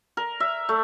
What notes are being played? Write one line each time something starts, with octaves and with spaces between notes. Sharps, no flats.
A#4
E5
A3